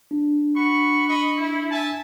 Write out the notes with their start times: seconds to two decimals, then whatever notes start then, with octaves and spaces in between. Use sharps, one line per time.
0.11 D4
0.55 F#4 B5 C#6
1.08 D#5 B5 C#6
1.38 E4
1.71 E5 G#5 A5